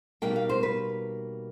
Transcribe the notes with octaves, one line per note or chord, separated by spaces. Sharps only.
B2 G3 A#3 D#4 G5
F5
C5
B4